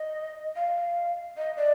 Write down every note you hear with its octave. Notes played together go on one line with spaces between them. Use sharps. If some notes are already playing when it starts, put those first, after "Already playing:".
Already playing: D#5
F5
D#5
D5